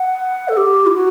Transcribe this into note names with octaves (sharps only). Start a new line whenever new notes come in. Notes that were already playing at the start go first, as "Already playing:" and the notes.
Already playing: F#5
A4
G4
E4
F#4